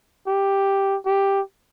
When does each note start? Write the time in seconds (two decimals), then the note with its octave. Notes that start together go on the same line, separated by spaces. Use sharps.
0.27 G4
1.06 G4